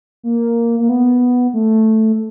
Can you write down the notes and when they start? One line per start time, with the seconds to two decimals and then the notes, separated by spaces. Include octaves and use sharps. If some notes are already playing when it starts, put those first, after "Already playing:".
0.23 A#3
0.80 A#3
0.89 B3
1.54 A3